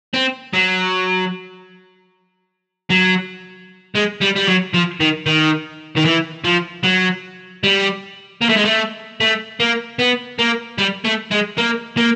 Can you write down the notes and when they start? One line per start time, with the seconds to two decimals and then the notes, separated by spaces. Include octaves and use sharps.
0.14 C4
0.53 F#3
2.90 F#3
3.95 G#3
4.21 G3
4.36 G3
4.48 F#3
4.74 F3
5.00 D#3
5.26 D#3
5.97 D#3
6.05 E3
6.45 F3
6.84 F#3
7.64 G3
8.42 A#3
8.49 A3
8.57 G#3
8.65 A3
9.20 A3
9.60 A#3
9.99 B3
10.39 A#3
10.78 G3
11.04 A3
11.31 G#3
11.58 A#3
11.97 A#3